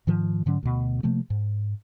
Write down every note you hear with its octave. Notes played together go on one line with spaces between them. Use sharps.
G#2 D#3 F3
G#2 D3 F#3 C#4
D2 B2
C3 F3 A3 A#3
G#2